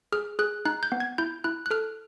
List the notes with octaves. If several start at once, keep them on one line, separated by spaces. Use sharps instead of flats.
G#4 F6
G#4 F#6
D#4 F#6
G6
B3
G#6
E4 G6
E4 F#6
F#6
A4 F6